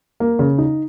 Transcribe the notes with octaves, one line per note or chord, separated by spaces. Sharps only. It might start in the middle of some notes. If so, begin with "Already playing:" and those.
A#3
C#3
D#4